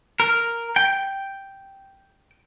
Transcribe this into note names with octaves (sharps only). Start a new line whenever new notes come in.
A#4
G5